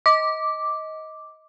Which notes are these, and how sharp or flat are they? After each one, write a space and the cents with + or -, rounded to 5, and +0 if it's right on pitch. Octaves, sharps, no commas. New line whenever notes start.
D#5 +20 D6 +0